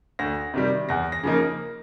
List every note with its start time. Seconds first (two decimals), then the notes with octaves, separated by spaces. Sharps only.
0.19 D2 A#6
0.54 C3 D#3 G3
0.89 E2 A#6
1.12 A#6
1.23 C#3 F3 A#3 D#4